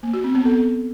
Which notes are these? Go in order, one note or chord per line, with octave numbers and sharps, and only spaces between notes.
A#3
F#4
C4
B3
A4